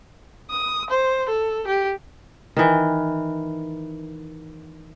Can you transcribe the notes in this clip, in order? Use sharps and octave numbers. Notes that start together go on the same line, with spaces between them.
D#6
C5
A4
G4
D#3 E3